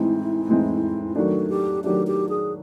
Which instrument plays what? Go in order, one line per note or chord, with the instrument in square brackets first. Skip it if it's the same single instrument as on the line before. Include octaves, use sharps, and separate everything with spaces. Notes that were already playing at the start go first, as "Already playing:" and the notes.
Already playing: [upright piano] A2 E3 G#3 C4 D#4 [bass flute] E4
[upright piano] A2 E3 G#3 C4 D#4
[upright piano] D#3 F#3 A3 D4 [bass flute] F#4
[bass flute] G4
[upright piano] D#3 F#3 A3 D4 [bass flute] G4
[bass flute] G4
G#4